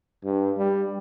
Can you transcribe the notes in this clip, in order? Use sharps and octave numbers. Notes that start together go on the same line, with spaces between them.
G2
G3